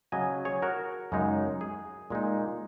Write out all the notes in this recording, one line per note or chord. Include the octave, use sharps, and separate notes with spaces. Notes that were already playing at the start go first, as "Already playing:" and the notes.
C#3 F#3 C#4 D#5 G#5
G#4 C#5
F#4 A#4
F#2 C#3 G#3 D#4
G#4
A#2 G#3 D#4